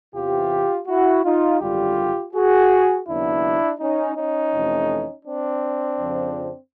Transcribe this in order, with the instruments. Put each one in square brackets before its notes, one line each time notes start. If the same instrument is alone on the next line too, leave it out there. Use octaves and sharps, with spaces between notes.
[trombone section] E2 C3 E3 F4 G4
E4 F#4
D#4 F4
G#1 F#2 D3 G3 F4 G4
F#4 G#4
D#2 C#3 F#3 B3 D4 E4
C#4 D#4
C#4 D#4
F2 C3 E3 A3
C4 D4
F2 C#3 F3